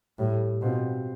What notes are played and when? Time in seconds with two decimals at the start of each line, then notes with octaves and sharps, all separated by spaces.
0.18 A2 G3
0.61 B2 C4 F4 C5